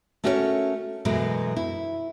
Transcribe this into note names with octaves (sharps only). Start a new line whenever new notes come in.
A3 C#4 F#4 A#4 B4 C#5
F#2 B2 E3 F#3 G#3 A3
E4